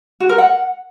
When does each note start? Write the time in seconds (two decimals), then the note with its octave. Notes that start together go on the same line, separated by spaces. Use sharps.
0.20 F#4
0.29 A#4
0.38 F#5